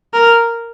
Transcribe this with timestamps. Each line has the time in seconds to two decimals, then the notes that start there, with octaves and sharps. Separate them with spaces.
0.13 A#4